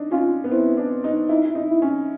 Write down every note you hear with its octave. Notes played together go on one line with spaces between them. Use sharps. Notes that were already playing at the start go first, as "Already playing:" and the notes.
Already playing: D4 D#4
C#4 F4
B3
C4 E4
D4
D#4
D#4 E4
E4
D#4
E4
C#4